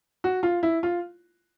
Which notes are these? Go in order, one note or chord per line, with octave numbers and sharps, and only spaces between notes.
F#4
F4
E4
F4